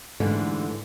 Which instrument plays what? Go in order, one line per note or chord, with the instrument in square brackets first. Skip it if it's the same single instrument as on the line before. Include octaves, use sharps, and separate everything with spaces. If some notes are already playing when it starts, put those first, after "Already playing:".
[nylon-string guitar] G#2 D3 E3 G3 A3